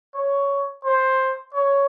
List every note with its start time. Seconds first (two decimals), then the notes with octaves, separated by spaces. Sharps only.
0.14 C#5
0.85 C5
1.54 C#5